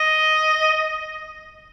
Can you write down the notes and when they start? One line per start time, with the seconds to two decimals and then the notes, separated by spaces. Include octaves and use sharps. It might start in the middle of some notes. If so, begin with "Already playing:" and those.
Already playing: D#5